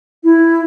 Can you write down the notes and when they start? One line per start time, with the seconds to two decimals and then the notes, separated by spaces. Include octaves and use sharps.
0.24 E4